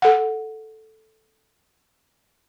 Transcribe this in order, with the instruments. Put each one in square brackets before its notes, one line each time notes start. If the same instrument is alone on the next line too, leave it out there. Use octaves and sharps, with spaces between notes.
[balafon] A4 F#5